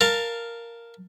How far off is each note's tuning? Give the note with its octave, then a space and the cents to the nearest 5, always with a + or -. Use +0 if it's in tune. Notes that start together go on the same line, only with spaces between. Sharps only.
A#4 +0 F5 +0 A5 +10